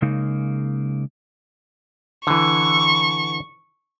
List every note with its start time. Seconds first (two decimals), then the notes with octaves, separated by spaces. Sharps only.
0.02 C#3 G#3 A#3 D#4
2.27 D3 E3 C#6